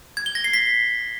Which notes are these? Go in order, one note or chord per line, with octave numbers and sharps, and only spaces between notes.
G#6
G7
A#6
C7
B6